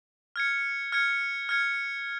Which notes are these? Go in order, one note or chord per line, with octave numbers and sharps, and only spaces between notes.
F6 G#6 C#7
F6 G#6 C#7
F6 G#6 C#7